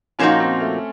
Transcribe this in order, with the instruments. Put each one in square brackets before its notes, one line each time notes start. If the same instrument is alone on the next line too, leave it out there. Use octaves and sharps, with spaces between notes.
[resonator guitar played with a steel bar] A#2 F3 A#3 D#4 F#4 [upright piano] C#4
[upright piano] C4
A3